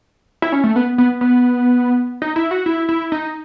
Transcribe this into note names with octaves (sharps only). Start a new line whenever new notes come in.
E4
C#4
A3
B3
B3
B3
D#4
E4
F#4
E4
E4
D#4